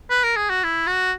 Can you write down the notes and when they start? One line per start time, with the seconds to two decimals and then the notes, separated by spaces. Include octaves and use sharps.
0.10 B4
0.24 A#4
0.36 G#4
0.50 F#4
0.64 E4
0.87 F#4